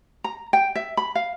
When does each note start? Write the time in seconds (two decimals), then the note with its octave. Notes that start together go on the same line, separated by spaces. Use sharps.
0.24 A#5
0.53 G5
0.75 E5
0.97 B5
1.15 F5